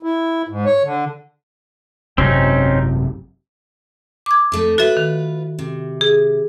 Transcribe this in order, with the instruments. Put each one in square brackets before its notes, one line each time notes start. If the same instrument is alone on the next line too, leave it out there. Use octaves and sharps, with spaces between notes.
[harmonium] E4
G#2
C#5
D3
[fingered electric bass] G#1 F#2 C3 [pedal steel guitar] C4 C#4 D#4
[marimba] D6 G#6
[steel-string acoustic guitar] F2 A3 D#4
[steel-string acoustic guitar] F4 B4 [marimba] F#4 A4 E5
[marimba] D#3
[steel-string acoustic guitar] C3
[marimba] G#4